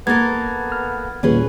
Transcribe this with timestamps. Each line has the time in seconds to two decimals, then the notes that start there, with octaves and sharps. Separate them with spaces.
0.07 A#3 B3 A4 A#4 G#6 A6
0.72 F6
1.23 D#2 A#2 G3 C#4 G#4 B4